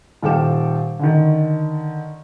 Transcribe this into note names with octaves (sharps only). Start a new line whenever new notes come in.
D#1 A4 F5 G5 D6 E7
D3 D#3